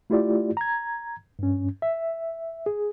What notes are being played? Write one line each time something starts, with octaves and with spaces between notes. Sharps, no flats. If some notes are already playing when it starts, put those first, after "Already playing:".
A3 E4 F4 G4 D5
A#5 G#6
G2 C#4
E5
G#4